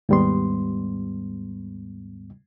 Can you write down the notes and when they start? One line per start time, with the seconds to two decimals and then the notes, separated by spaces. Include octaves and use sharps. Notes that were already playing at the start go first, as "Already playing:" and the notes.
0.09 D#2 G#2 G3 B3 C6